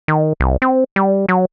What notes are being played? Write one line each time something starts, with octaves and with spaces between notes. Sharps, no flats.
D#3
C2
C4
G3
F#3